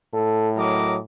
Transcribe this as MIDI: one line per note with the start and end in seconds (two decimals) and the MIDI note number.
0.14 1.01 45
0.14 0.50 69
0.57 0.98 54
0.57 0.98 70
0.57 0.98 75
0.57 0.98 86